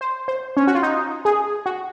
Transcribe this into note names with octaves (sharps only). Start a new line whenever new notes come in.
C5
C5
C#4
F#4
F4
D#4
G#4
F#4